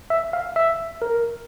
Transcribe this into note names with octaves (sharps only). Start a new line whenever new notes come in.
E5
F5
E5
A#4